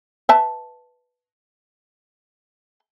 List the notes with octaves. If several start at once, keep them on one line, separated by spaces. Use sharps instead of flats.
B4 E5 A5